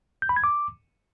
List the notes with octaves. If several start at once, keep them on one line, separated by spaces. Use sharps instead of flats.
G6
B5
G#6
D6